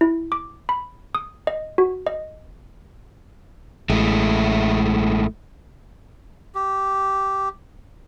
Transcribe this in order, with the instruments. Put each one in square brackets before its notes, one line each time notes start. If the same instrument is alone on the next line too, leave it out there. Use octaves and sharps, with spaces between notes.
[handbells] E4
D6
B5
D#6
D#5
F#4
D#5
[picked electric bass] A1 [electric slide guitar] G#3 A3 E4
[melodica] G4